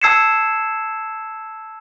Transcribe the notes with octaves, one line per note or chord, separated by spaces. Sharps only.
A5 E6 G#6 C7 C#7 E7